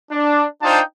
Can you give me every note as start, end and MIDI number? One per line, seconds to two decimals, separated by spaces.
0.12 0.44 62
0.63 0.80 62
0.63 0.80 63
0.63 0.80 65
0.63 0.80 72
0.63 0.80 79
0.63 0.80 81